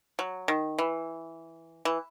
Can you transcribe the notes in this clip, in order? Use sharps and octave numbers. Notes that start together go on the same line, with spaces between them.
F#3
D#3
E3
E3